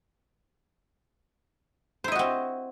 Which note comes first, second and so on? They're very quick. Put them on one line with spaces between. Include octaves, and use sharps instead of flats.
C5 E4 D#5 F#4 C4